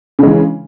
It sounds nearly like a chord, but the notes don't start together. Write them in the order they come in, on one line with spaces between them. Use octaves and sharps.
C#3 G#3 E3